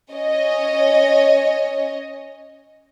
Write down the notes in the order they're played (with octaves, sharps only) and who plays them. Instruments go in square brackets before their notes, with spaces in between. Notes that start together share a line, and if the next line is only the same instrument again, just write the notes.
[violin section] C#4 C#5 D#5